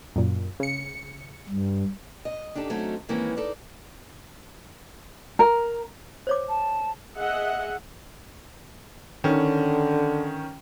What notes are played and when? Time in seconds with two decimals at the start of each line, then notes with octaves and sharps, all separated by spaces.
0.16 F#2 A#2
0.60 C#3 C#7
1.49 G2
2.25 D#5
2.55 D4 D#4 G4 A4
2.70 F#3 A3 C4 C#4 D#4 F#4
3.09 D#3 E3 G#3 A#3 C4 C#4
3.37 D#4 A4 A#4 D5
5.39 A#4
6.27 C5 C#5 D6
6.49 A5
7.17 G#4 D#5 E5 F#5
9.24 D3 D#3 C#4